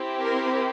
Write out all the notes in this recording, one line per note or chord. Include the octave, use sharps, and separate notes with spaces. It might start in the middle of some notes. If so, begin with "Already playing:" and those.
Already playing: C4 E4 G4
A#4